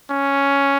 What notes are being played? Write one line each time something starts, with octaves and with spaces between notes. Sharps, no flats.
C#4